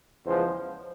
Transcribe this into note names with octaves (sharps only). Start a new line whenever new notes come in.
E2 C#3 F3 G#3 C5